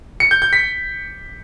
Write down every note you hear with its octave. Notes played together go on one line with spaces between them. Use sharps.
C#7
G6
G6
B6